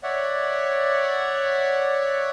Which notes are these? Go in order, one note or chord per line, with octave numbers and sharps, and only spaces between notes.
C#5 D5 E5 F#5